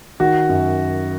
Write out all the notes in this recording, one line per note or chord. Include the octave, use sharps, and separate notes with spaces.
D#3 F#4
F#2